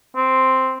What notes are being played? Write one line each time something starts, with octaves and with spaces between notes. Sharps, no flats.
C4